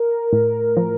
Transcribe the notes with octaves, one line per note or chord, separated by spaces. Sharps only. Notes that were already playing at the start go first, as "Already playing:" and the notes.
Already playing: A#4
A2
F3